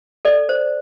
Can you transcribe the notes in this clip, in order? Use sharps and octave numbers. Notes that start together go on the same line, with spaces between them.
A4 D5
C5